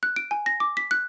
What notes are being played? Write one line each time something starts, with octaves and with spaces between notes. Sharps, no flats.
F#6
D7
G#5
A#6
D6
B6
F#6